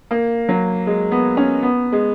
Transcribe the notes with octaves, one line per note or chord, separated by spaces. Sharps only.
A#3
F#3
G#3
B3
C#4
B3
G#3